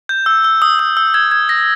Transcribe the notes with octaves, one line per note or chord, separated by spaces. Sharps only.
G6
E6
E6
D#6
D#6
E6
G#6
G#6
A#6